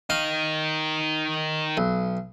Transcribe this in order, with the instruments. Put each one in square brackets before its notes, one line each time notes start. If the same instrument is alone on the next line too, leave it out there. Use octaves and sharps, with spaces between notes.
[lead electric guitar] D#3 D#4 [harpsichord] F5
[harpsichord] B1